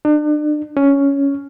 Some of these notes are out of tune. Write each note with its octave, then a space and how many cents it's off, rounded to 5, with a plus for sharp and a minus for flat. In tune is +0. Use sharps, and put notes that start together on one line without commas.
D4 +35
C#4 +10